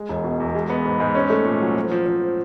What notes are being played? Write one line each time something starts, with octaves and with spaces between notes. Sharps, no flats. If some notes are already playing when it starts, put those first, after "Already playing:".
Already playing: G#3
E1
B2
E2
G#3
B3
G#2
G#2
C#4
A3
A#2
F#3
F3
F3
F3